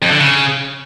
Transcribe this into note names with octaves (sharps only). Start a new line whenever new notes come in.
F2
D3
C#3